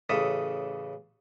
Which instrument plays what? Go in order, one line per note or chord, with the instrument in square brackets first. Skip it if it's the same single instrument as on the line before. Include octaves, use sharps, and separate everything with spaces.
[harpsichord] A1 C#3 A4 E5 D#6